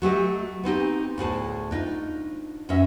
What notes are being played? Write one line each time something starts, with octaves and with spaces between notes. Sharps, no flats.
F#3 A3 G4 D#5
B3 C4 D#4 G4
D2 A2 G#4 A5
D4 D#4 F4
F#2 F#3 C#4 D#5 E5